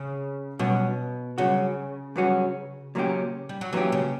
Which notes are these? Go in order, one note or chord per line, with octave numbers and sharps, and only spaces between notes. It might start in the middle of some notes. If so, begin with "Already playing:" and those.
Already playing: C#3
G2 B2 F#3 C#4 F#4
G2 C#3 F#3 C#4 F#4
G2 F#3 C#4 F#4
A#2 F#3 A#3 C#4 G4
G3
F#3
A#2 E3 F#3 A#3 C#4 G4
C#3